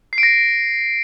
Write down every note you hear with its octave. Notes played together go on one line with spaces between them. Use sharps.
C7
D7
A#6